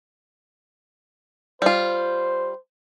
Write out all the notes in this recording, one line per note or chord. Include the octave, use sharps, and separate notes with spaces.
G3 F4 C5